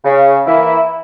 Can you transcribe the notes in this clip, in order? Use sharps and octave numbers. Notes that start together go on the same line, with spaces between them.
C#3
E3 A#3 E4